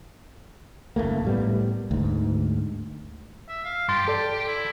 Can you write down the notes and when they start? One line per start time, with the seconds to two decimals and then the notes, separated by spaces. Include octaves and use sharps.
0.96 F#1 D#2 A3 A#3
1.25 A2 G3 B3
1.91 D2 G#2
3.49 E5
3.65 F5
3.88 G2 G4 C6 A6
4.08 A4 D5
4.48 E4